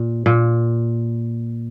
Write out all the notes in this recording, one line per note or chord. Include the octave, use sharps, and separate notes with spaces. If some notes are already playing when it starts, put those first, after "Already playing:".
Already playing: A#2
A#2